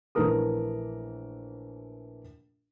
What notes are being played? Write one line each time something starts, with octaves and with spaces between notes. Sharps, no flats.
A#1 E3 A3 A4 A#4 D#6